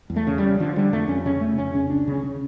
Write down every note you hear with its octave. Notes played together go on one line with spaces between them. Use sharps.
E2
A3
C#3
C#3 G3
D3 F3
D3 G3
F2 A3
F2 C#4
C#3 C#4
C#3 A3
F2 C#4
C#3 C#4
C#2 D4
C#3 C#4
C#3